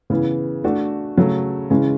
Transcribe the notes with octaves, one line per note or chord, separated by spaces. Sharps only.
C#3 E3 B3
A3 D4 F#4
C#3 F#3 A3
C#3 E3 G#3 C#4